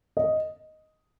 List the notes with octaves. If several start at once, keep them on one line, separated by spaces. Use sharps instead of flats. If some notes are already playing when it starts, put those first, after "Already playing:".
D#5